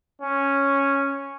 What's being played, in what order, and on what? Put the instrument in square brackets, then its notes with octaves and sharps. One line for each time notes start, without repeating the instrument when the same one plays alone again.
[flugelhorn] C#4